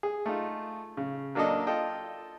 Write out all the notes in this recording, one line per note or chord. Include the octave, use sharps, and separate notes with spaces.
G#4
A3 D#4 F4
C#3
F#3 A#3 D4 F#4 A4 D#5
F4 A4 D#5 G5